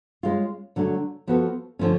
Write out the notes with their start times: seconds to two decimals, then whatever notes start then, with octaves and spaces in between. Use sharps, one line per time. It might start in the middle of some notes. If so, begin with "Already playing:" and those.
0.23 G#3 C#4 F4
0.76 D3 F#3 A3
1.27 F3 B3 F#4 A4
1.79 D3 F3 A3 C#4